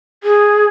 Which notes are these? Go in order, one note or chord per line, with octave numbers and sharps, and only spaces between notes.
G#4